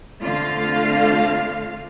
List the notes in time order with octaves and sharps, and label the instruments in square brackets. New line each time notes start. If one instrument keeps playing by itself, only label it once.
[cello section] D3 A3 C4 F4 F5